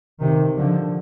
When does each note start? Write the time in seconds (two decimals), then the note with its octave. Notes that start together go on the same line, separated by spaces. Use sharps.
0.21 C3 D#3
0.57 D3 F3